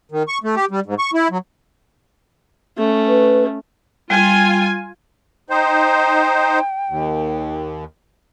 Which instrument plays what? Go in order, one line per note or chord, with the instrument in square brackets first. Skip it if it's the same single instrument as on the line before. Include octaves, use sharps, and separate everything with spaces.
[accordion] D#3
C#6
A3
G4
G3
G#2
C#6
E4
F#3
[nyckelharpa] A3 C#4
[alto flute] B4
[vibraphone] G3 [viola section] F4 G#5
[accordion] D#4 C5 [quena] G5
[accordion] D#2